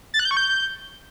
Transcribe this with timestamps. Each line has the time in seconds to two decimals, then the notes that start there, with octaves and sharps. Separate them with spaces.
0.14 A6
0.19 F#6
0.25 G6
0.31 C#6
0.37 G6